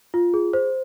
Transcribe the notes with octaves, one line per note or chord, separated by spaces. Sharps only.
F4
G#4
C5